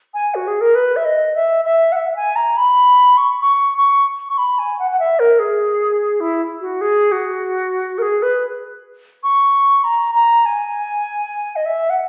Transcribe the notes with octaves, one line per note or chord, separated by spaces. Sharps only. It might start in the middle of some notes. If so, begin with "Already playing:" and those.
G#5
F#4
G#4
A#4
B4
E5
D#5
E5
E5
F#5
E5
G#5
A#5
B5
C#6
C#6
C#6
C#6
B5
G#5
F#5
F#5
E5
A#4
G#4
E4
F#4
G#4
F#4
A#4
G#4
B4
C#6
A#5
A#5
G#5
D#5
E5
F#5